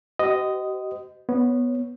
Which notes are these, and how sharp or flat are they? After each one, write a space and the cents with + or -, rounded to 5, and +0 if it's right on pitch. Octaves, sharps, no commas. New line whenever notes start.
G4 -45 C5 -40 D#5 +0
B3 +0 C#5 +0